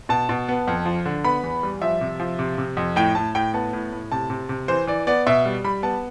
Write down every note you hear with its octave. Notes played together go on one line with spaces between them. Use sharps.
B2 A5
B2
B3
F2
F3
D3
B3 B5
E2
G3
F3 E5
C3
F3
C3
C3
F2
A2 G5
A2 A5
A2 G5
B3 A5
A2
A2
C3 A5
C3
C3
E3 C5
E3 D5
B3 D5
B2 E5
G3
G3 B5
B3 A5